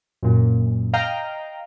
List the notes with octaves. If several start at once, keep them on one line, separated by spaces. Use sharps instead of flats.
F#2 A#2
D#5 F5 G5 A#5